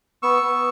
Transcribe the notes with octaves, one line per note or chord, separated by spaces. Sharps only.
B3 C#6 E6
B3